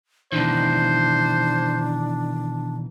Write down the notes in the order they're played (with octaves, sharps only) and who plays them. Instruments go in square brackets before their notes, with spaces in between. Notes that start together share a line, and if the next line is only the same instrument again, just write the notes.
[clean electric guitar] B2 D#3 E3 [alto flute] D4 [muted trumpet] C5